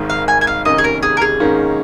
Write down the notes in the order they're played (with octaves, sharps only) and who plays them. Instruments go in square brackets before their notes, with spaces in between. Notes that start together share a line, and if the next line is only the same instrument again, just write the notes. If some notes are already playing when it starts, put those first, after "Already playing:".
Already playing: [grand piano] G#1 G#2 D#3 G#3
[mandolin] F5
G#5
G#5
F5
[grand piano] F1 D#2 D#3 A#3 C#4 [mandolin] D#5
[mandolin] G#4
A#4
G#4
A#4
G#4
[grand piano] G#2 D#3 A#3 C#4